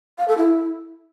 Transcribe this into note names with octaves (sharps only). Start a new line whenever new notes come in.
F5
A4
E4